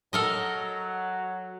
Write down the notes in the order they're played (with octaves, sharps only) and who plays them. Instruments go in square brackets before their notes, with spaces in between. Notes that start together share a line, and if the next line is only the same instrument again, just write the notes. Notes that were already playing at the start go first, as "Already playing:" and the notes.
[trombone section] F#3 [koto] A4 A#4 D#5